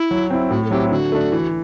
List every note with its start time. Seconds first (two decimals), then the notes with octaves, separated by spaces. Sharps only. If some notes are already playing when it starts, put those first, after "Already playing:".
Already playing: E4
0.11 F#3
0.30 C4 E4
0.51 A2 F#4
0.64 A4
0.71 F#3 C4 E4 G4
0.91 D3 F#4
1.12 A3 D4
1.32 E3